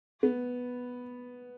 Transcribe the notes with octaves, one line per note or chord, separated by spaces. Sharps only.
B3